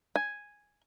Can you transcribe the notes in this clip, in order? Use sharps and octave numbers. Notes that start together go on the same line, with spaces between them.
G#5